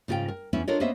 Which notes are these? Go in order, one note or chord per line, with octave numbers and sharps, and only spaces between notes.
G#2 C#3 F4 A4 G5
A#4
E2 B3 C#4 E4
D4 F4 A4 A#4 C#5 D#5
A#3 B3 C#4 C5 D#5 E5